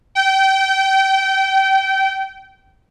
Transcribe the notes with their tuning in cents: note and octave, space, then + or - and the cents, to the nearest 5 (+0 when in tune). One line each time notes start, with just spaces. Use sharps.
G5 -25